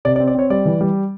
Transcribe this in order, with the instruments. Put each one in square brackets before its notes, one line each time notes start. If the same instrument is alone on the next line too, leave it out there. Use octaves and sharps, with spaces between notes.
[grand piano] C3 D5
D5
C4
D5
C4 C#5
G3 D5
E3
G3